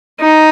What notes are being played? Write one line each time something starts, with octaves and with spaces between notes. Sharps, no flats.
D#4